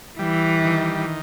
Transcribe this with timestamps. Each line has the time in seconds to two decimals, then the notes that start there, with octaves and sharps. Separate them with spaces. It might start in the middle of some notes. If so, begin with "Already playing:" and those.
0.19 E3 G3
0.64 D#3